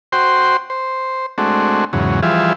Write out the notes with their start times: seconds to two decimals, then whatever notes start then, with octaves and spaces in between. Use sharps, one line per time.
0.12 F#4 C5 G5 C6
0.70 C5
1.38 G#3 A3 C4 D4 F#4
1.93 E2 G#2 C#3 F#3
2.23 E3 F3 G3 F4 G#4 E5